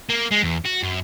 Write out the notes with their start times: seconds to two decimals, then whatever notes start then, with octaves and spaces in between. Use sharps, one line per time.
0.10 A#3
0.32 G#3
0.43 E2
0.66 F#4
0.83 F#2